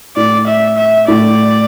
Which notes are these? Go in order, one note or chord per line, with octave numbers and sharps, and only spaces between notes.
A2 D5
E5
E5
A2 D5